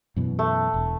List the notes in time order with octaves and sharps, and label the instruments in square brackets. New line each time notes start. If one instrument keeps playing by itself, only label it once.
[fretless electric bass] F#2 B2 E3
[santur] A3
[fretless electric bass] E1